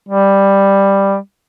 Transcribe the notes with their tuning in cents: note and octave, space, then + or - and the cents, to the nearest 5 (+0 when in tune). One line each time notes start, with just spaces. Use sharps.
G3 +5